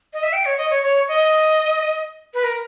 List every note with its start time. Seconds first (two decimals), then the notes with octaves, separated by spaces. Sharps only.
0.13 D#5
0.23 E5
0.33 G5
0.45 C#5
0.58 D#5
0.70 C#5
0.83 C#5
1.08 D#5
2.34 B4
2.44 A#4